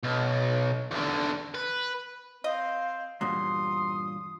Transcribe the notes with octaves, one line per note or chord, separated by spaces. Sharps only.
B1
E2 D3
B4
C4 D#5 F5
E2 G2 A#2 F#3 C6 D#6